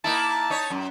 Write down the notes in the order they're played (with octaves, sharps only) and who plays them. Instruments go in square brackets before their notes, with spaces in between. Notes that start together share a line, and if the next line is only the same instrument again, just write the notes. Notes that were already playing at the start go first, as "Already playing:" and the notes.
[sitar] A#3 D#4 E4 [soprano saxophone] A5
[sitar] D#4 C#5
F#2